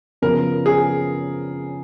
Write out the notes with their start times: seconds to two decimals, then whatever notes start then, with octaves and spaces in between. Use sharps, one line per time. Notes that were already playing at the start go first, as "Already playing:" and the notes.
0.22 F#2 C#3 F3 B3 A#4
0.66 G#4